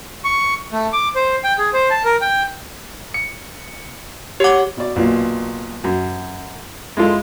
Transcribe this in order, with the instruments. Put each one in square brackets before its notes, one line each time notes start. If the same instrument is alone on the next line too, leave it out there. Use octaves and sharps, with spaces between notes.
[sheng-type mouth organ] C#6
A3
D6
C5
G5
G#4
C5
A5
A#4
G5
[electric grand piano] C#7
[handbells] G4 D6 [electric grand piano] C#5 F#5
[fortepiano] B2 D5
B1 A#2
F#2
G#3 E4 F4 A4